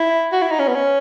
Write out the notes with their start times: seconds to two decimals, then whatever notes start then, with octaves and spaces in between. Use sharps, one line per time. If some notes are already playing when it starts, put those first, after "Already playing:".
Already playing: E4
0.32 F#4
0.42 E4
0.51 D#4
0.59 C#4
0.68 B3
0.75 C#4